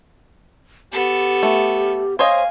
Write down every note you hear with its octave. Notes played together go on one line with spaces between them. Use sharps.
B3 G4 A4
A3
C5 C#5 D#5 F5 G#5